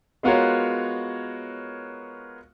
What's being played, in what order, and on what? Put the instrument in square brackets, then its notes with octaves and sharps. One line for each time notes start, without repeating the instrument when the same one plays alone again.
[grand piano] G#3 B3 F4 F#4 A#4 C#5